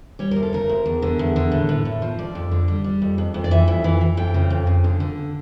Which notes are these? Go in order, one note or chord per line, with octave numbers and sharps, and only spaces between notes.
G3 C#5
A#4
D2
A4
C#3 A#4
D2
E2
D3
E2
D3
A2
A2
A2
F3
F2 D5
F2
D3
G3
G3
F2
F2
F2
D5
E3 E5
F2
E3
E3
F2 G5
C#3
F2
C#3
D3
D3